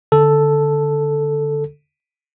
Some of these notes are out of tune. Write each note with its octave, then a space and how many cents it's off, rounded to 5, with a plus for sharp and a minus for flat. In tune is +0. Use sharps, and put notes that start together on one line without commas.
D3 -10 A4 +0